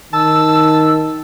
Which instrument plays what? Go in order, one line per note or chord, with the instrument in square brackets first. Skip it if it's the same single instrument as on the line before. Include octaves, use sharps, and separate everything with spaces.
[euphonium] D#3 [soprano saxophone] A5 [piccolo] E6